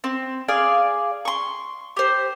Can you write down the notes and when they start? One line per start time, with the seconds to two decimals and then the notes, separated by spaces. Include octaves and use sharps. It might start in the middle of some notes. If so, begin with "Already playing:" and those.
0.04 C4
0.48 G#4 D5 F5 G#5
1.25 C6 C#6
1.97 G4 C5